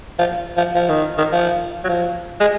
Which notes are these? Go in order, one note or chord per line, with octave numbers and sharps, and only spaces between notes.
F3
F3
F3
D#3
D#3
F3
F#3
F3
G#3